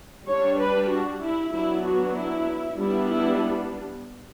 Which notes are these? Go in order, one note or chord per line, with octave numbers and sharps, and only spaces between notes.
G3 D4 C#5
B4
F#4
E4
F#3 B3 D4 E4
F#4
E4
G3 B3 D4 E4
E4